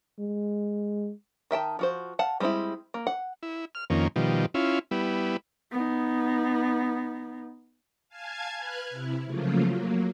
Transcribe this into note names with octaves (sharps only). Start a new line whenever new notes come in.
G#3
D#3 E5 G5 A5
F3 F#4 C5
F5 F#5 A5
G3 G#3 C4 D#4 E4
A#3
F#5
E4
F6
F2 D#3 A#3 C#4
B2 D#3 F3 G3
C#4 E4 F4
G3 B3 E4
B3 D#4
F5 G#5 A5 G#6
B4 F6 F#6 G#6
C3 E4
C#3 F3 F#3 A3 A#3 F4
F#3 A#3